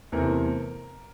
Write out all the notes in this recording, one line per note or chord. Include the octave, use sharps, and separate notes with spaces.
E2 C3 E3 A3 C4 A#4